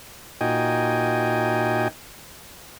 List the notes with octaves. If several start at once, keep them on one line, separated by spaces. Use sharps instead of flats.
A#2 D#4 F#4 D#5 G5 G#5